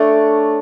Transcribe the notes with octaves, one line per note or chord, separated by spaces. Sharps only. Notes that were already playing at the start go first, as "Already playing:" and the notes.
Already playing: A3 D4 C#5